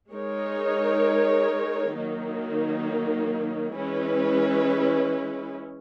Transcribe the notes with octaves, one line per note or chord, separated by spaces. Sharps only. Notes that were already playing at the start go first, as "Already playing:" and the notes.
G#3 D#4 A#4 C#5
D#3 F#3 A#3 D#4
E3 G#3 C#4 E4 B4